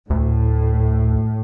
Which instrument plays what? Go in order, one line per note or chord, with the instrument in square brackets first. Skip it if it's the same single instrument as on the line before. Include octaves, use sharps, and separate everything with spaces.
[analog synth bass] D2 [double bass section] A2